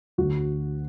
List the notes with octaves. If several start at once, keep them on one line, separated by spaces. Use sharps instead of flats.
D2 D3 F#4